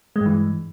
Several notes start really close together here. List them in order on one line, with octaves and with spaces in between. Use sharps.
G#3 G2 E3